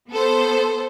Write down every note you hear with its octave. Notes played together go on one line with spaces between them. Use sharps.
B3 A4 C5